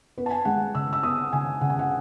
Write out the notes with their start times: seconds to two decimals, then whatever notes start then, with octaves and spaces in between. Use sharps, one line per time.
0.18 B3 B4
0.26 A5
0.31 G#5
0.45 G#3 F#5
0.75 C#3 E6
0.93 E6
1.03 B3 D#6
1.33 C#3 G#5
1.61 C#3 F#5
1.70 G#5
1.79 F#5